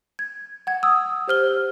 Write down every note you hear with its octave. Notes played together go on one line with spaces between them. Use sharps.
G#6
F#5 G#6
D#6 E6
G4 C5 F6 G7